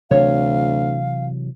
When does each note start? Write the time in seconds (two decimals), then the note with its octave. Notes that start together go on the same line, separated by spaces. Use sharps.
0.11 D2 C3 E3 F#3 C#5 F5